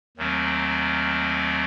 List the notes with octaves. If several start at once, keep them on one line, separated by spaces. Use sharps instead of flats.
D#2 D#3 F#3 A3 C4